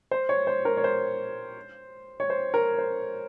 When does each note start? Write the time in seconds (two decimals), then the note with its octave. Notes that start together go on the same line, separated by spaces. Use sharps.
0.11 C5
0.29 C#5
0.47 C5
0.65 A#4
0.77 C#5
0.84 C5
2.20 C#5
2.30 C5
2.54 A#4
2.78 C5